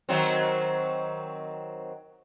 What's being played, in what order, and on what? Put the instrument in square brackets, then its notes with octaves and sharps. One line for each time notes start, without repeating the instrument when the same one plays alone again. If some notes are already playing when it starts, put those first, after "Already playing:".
[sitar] D#3 F#3 C4